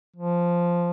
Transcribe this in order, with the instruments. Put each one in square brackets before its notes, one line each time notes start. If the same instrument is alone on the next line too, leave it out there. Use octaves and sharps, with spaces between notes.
[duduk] F3